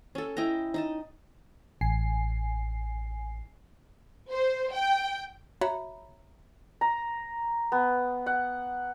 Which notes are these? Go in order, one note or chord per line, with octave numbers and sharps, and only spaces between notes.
C#4 A4
E4 D#5 G5 A#5
D#4 D#5 A5
A1 G#5 C7
C5
G5
F#4 C#5 E5 A#5 B5
A#5
B3
F#5